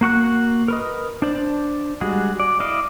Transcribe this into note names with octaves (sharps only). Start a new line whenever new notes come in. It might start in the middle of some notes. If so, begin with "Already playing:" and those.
A#3 F#4 C#6 F#6
A#4 B4 D#5
D4 C5 D5
G3 G#3 F#4 G#4
D5
E4 D5 D#5 F5